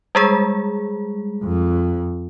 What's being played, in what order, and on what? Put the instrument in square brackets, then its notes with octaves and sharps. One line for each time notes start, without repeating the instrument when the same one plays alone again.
[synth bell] G3 G#3 G#4
[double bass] F2